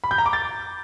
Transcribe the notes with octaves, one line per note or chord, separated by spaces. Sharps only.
B5
G6
A#5
D6
A6